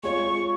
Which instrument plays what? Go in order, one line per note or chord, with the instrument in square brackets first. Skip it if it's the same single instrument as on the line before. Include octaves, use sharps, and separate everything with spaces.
[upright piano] G#3 F4 C#5 [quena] C#6